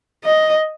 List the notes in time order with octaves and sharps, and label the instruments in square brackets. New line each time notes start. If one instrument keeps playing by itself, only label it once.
[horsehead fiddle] D#5